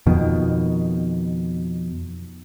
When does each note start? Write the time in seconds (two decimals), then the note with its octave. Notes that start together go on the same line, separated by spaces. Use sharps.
0.06 F2 B2 D#3